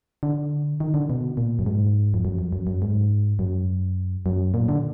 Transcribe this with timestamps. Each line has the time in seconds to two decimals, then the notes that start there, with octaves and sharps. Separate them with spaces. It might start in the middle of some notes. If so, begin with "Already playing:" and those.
0.23 D3
0.80 D#3
0.94 D3
1.10 B2
1.37 A#2
1.59 F#2
1.66 G#2
2.14 F2
2.25 F#2
2.39 F2
2.53 F#2
2.67 F#2
2.82 G#2
3.39 F#2
4.26 F#2
4.54 A#2
4.69 D3